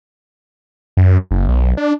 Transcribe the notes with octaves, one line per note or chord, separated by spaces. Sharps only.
F#2
F#1
B1
D4